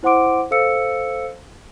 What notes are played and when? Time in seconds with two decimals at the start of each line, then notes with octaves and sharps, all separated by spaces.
0.03 E4 C5 F#5 C6 D6 D7
0.51 A4 C5 F5 E6 C#7